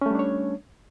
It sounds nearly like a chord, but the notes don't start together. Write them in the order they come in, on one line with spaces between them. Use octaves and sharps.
C#4 A3 G3 D4 C#5